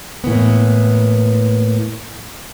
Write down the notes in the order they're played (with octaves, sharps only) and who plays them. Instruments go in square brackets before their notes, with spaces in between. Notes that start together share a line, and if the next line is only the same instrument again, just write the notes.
[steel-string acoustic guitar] A2 E3 A#3 B3